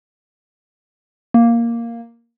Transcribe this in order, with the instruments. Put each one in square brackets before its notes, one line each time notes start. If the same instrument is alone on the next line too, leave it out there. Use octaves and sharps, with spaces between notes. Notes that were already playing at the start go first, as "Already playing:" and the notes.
[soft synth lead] A#3